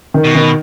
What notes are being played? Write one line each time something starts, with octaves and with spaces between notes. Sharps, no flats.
D#3
B2
D#3